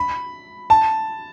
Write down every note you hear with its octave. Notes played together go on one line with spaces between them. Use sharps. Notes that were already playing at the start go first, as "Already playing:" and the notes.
Already playing: B5
A5